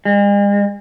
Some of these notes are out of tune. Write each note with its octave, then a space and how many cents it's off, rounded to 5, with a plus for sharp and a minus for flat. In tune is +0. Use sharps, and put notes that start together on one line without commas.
G#3 -45